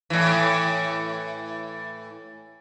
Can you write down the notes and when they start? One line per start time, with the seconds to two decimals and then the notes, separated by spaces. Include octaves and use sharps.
0.10 A2 E3